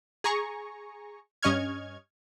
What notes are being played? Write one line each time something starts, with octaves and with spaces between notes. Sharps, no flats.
G#4 G#5 A#5 C#6
G2 C#4 D#5 C#6 F6 G#6